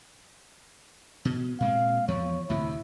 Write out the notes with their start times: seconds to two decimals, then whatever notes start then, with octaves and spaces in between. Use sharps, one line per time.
1.25 B2
1.60 A#2 G#3 C4 F5
2.08 E2 F3 C#5
2.50 D2 A2 C3 E4